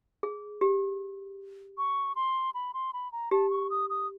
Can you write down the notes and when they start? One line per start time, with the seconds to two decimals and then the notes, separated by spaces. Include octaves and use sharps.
0.23 G#4
0.61 G4
1.78 C#6
2.16 C6
2.54 B5
2.74 C6
2.93 B5
3.12 A#5
3.31 G4 A5
3.51 C#6
3.70 D#6
3.90 D#6